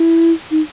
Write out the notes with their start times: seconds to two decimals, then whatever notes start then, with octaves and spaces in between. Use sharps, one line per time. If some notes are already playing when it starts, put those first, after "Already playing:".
Already playing: E4
0.51 D#4